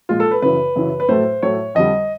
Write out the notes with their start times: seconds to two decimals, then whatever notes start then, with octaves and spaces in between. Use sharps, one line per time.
0.09 A#2 F3 G#3 F4
0.20 A4
0.31 B4
0.42 F#2 C#3 E3 B4
0.76 F#2 C#3 E3
1.00 B4
1.09 A2 F#3 A3 C5
1.42 A2 F#3 A3 C#5
1.75 F2 D3 G3 D#5